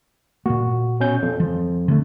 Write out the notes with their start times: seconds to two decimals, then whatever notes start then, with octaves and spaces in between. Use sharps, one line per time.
0.46 A#2 A#3 F#4
1.00 B2 C#4 G6
1.22 F2
1.40 F3
1.88 D3 F#3 A3